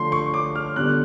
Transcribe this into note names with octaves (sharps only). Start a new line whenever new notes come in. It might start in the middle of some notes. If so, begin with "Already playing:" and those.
Already playing: D3 F3 A3 C6
C#6
D6
F6
D3 G3 B3 F#6